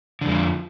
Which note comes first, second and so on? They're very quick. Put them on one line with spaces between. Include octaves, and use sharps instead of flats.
D3 F2 F3